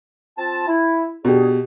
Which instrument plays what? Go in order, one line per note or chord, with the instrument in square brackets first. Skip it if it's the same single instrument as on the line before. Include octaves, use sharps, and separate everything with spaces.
[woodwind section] C4 F4 A5
E4
[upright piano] B2 G4 [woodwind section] D4 G#4